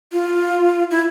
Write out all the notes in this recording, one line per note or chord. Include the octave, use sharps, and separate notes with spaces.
F4
E4